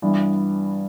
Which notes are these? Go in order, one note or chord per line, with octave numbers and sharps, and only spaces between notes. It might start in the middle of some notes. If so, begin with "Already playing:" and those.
G2 E3 B3